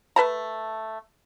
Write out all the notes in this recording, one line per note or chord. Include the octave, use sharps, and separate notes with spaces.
A3 B4 A5 A#5